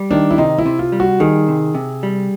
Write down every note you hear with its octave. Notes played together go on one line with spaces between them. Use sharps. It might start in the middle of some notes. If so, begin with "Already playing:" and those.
Already playing: G3
D#3 D4
E4
C3 D#4
E4
C3
F4
G3
F#4
D#3 G#4
C3
C3
G3